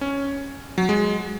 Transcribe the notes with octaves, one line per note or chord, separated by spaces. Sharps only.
C#4
F#3
G#3